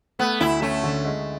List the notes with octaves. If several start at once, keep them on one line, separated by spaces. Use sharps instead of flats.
A3 B3
D2 E4
A3 C#4
D3
G#3